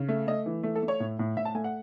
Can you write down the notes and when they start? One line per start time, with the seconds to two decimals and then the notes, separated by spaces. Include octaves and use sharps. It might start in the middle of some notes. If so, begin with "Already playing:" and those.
Already playing: C#3
0.08 A3
0.27 A3 D#5
0.46 E3
0.63 A3
0.76 A4
0.83 A3
0.88 C#5
1.00 A2
1.19 A2
1.37 A2 E5
1.45 A5
1.54 A3 G#5
1.64 F#5